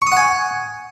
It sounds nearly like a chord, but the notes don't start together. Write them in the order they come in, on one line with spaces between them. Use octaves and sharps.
C#6 D#6 F#5 G#5